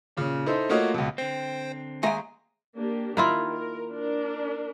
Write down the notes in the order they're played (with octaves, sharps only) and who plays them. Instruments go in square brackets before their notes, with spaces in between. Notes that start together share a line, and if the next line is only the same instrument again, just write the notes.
[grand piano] A#2 C#3
D#4 E4 A4 C5
A3 A#3 F4 F#4 C#5 D#5
C#2 B2
[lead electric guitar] D3 C4 [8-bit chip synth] C5 G5
[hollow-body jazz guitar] D#2 G#3 A#5 [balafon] E5 F5 [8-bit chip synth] G#5
[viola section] A#3 D4 G4
[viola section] D#3 [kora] A#3 E4 F4
[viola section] A#4
D4 A#4